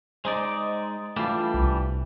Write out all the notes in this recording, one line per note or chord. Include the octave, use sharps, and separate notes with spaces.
G#3 D#4 C5 D5 D#5
E3 G3 A3 D4 F4
C2